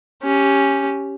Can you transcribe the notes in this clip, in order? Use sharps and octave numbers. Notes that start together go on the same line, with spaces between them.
C#4 G4